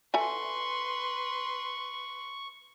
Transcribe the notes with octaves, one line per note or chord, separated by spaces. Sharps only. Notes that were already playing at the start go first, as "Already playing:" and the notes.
A4 B4 E5 G#5 C6 C#6